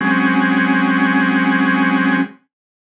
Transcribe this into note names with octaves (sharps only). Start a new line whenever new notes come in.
F#3 G#3 C4 C#4